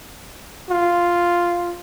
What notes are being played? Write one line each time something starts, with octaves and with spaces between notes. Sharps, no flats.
F4